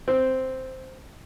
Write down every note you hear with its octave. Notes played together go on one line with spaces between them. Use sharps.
C4